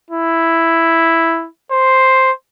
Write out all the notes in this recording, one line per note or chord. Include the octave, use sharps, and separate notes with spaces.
E4
C5